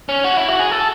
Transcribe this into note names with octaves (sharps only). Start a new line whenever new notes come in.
C#4
F#4
E4
F#4
G#4
A4